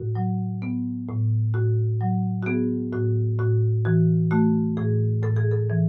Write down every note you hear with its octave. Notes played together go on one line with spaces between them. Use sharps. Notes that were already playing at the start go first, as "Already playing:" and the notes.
Already playing: A2 F#4
F#3
B3
A2
A2 F#4
F#3
F#4
B3 G#4
A2 F#4
A2 F#4
E3 F#4
A3 F#4
A2 G#4
A2 A4
G#4
A4
E3